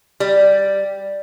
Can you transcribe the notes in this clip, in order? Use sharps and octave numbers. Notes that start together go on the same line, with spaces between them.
G3